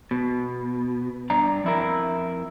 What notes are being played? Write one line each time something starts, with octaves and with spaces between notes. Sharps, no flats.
B2
G2 D4 A#5
F2 E4 A#4